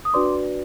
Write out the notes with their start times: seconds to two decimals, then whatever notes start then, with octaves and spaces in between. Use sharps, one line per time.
0.05 D#6
0.14 D4 F#4 B4 D5 C6 D6